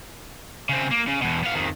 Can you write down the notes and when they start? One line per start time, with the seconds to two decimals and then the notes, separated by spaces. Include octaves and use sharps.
0.69 C#3 C4
0.91 A#3
1.07 C#3
1.22 E2 B2
1.43 B3 F5
1.55 F2 D#3